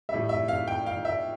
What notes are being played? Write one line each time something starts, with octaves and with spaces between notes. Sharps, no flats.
A2 G3 E5
E5
F5
G5
F5
E5